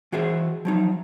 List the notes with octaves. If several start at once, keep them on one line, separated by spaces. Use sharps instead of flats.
E3 F#4 G#4 C5 E5
F3 F#3 D#4